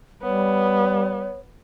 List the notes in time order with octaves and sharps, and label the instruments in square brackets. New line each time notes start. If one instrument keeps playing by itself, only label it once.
[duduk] G3 [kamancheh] B3 [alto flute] C#5